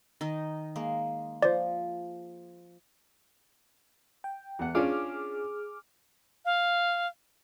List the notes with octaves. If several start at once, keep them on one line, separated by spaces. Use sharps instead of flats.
D#3 D#4 D#5
G#3 A#3
F3 C5 D5
G5
E2 F#5
C#4 D4 F4 G#4 D6 F6
F5